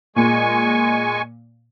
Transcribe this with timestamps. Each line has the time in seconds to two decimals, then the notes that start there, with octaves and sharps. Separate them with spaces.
0.16 A#2 G#3 G#5 C#6